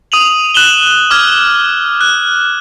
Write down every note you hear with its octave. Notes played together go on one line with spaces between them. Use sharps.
D#6 D#7 F7 F#7
F#6 E7 F#7 G7
D6 F6 G#6
F#6